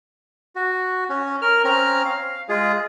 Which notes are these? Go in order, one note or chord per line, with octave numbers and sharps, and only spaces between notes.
F#4
C#4
A#4 F6
C4 C#4 A#5 F6
F5
G#3 F4 G#4